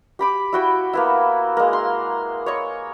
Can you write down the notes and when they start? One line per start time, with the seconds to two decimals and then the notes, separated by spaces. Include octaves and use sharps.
0.19 G4 B5 D6
0.53 E4 F#4 G5
0.93 A#3 B3 E4
1.57 G#3 A#3
1.73 C6
2.46 C#5 D#5 C#6